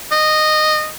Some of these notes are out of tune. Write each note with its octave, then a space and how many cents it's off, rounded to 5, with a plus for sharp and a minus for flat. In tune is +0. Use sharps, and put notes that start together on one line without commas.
D#5 -15